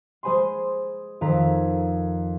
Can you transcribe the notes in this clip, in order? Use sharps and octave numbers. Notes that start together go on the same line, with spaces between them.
G#3 G#4 C5 G#5 B5 C6
F2 D#3 A4 F5 A#5 B6